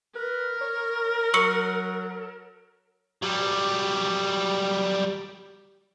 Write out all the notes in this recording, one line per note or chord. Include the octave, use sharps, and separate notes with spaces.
A#4 B4
C#5
F#3 C#6 E6 C#7
F#3 G3